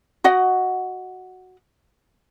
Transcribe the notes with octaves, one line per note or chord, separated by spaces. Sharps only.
F#4 D#5 F#5